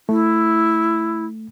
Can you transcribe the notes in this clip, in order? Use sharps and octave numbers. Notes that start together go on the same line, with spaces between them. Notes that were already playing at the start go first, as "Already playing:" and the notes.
A3 E4